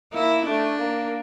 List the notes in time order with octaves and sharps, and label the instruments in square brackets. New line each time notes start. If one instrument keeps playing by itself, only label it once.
[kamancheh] A#3 [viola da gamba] E4
[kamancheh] A3 [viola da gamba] D4
[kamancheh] A#3